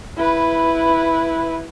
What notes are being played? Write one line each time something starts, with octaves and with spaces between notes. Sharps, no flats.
E4 B4